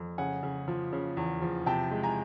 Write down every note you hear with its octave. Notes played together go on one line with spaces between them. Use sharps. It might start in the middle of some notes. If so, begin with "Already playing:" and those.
Already playing: F2
C#3 F#5 G#5
C#3
F3
C#3
E2
F3
C3 G5 A5
G#3
G#5 A#5